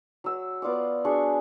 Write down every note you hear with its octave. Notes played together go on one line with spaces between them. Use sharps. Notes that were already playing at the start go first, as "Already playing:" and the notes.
F#3 E6
B3 F4 D5 D6
D4 F#4 G#4 C#6